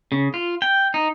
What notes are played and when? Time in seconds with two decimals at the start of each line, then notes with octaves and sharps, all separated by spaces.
0.12 C#3
0.34 F4
0.62 G5
0.94 D#4